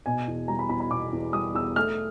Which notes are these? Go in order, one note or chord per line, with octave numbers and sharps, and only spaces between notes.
B2 G#5
E2
G3 A#5
B5
E2 B5
B5
B2 D6
E2
G3 D#6
E2 E6
A3 F6